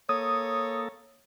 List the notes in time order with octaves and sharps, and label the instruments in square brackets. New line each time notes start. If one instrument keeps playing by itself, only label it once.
[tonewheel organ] A#3 A4 [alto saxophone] C#5 [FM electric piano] D#6